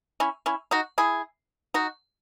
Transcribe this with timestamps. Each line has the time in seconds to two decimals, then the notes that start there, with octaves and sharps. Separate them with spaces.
0.20 C#4 E4
0.46 C#4 E4
0.71 D#4 F#4
0.98 E4 G#4
1.74 D#4 F#4